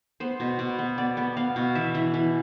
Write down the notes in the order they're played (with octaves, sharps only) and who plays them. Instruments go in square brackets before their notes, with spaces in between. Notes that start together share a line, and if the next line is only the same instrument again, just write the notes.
[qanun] B3 C5
B2
B2
B3
B3 D5
B3
B3 F5
B2
E3 E5
E3
E3